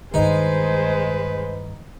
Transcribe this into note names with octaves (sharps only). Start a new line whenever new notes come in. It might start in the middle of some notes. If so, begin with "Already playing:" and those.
G2 D#3 G#3 D#4 B4 C5